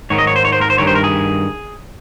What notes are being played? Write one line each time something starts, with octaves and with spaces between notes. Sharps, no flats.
G#2 D#3 C#5
D#5
C#5
C5
C#5
C5
A#4
C5
G2 D#3 C#5
C5
A#4
G#4